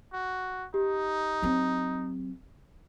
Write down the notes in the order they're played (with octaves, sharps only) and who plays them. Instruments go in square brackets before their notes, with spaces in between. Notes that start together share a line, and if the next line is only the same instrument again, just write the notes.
[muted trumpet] F#4
[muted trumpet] D#4 [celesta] G4
[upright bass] F#3 C4